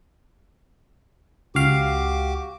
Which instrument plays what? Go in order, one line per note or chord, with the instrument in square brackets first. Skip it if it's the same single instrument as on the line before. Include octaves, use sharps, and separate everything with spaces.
[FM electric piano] C#2 F5 [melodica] F#4 G4 D6